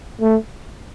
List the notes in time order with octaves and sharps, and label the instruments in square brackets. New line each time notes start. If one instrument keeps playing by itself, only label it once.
[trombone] A3